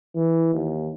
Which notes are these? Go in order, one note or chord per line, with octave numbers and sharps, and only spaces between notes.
E3
D#2